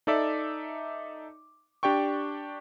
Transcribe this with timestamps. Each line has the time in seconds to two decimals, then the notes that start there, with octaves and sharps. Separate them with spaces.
0.07 D#4 A4 D5 E5 D6
1.83 D4 G4 D5 G5 C#6